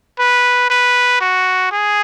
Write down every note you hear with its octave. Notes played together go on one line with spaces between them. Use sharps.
B4
B4
F#4
G#4